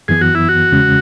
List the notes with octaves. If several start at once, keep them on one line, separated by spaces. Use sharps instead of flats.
F#2 E3 B3 G#4
F#4
E4
F#4
E2 C#3 G#3 C#4